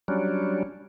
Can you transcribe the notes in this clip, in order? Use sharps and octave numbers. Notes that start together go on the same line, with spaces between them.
F#3 G3 C#4 D4